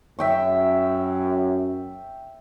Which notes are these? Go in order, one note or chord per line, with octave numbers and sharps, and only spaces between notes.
F#2 E5 G5 C#6